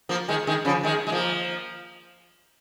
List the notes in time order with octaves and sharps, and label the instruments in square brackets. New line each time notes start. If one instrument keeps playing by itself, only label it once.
[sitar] F3 A#3
D#3 G#3
D#3 G#3
C#3 F3
D#3 G#3
G#3
F3 A#3